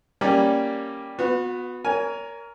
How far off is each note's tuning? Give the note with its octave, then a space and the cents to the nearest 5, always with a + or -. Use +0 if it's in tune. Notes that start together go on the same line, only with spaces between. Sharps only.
G3 +0 A#3 +0 C#4 +0
B3 +10 F#4 -35
A#4 +0 C#5 +35 G#5 +5